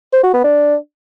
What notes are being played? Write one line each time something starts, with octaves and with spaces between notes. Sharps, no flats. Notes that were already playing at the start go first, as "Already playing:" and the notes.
C5
F#4
B3
D4